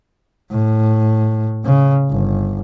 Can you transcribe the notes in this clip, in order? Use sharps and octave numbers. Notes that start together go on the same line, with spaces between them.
A2
C#3
G1